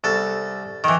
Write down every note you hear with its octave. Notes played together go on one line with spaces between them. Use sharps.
C2 A4
D#3 E3